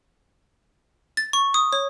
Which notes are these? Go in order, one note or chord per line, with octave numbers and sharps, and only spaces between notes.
A6
C#6
D#6
C#5